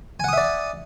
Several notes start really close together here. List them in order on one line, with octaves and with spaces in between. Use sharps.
G#5 F#5 D#6 E5 D5